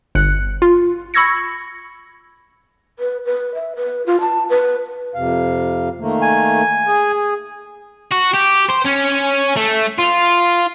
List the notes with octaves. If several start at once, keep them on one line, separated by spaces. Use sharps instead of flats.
G1 F#6 C#7
F4
B5 C#6 E6 G#6 A#6 C#7
B4
B4
E5
B4
F4
A5
B4
F2 C3 F5
D#3 A3 A#3
G#5
G#4
F#4
G4
C5
C#4
A3
F4